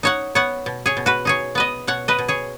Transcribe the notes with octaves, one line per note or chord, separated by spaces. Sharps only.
D#4 C#5 F#5
B3 C#5 F#5
B2
G#4 C#5
B2
F#4 B4
D#4 G#4 C#5
B3 B4 D#5
B2 C#5 F#5
B4 D#5
B2
G#4 C#5